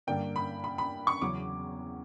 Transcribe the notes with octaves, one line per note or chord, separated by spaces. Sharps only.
G2 D3 A#3 D4 G5
B5
B5
B5
C#6
E2 C#3 F#3 C#4 D6